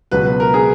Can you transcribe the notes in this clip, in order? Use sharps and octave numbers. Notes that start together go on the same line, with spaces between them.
C#2 B2 F#3 B4
B4
A#4
G#4